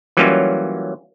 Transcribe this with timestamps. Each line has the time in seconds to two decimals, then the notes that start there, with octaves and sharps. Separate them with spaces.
0.17 E3 F#3 G3 A#3 C#4 F4